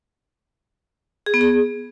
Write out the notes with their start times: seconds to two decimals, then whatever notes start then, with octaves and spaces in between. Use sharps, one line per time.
1.26 G#4
1.34 B3
1.41 G#4